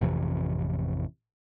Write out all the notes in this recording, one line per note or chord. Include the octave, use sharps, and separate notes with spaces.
A1 F2 C3 E3